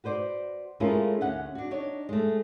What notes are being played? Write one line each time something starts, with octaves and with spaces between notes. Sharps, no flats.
F#4 B4 C5 D5
G#3 A3 C#4 E4 F4 A#4
D2 C#4 E5 F#5
D4 F#4
D4 D#4 C#5
G#3 A3